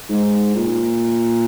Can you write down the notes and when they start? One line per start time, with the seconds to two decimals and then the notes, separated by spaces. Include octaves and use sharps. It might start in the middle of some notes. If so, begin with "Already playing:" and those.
0.10 G#2
0.55 A#2